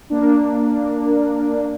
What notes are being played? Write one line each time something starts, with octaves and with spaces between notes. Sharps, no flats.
A#3 D4